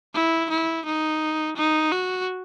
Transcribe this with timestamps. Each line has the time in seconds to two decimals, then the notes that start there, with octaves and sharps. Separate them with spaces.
0.14 E4
0.50 E4
0.86 D#4
1.57 D#4
1.92 F#4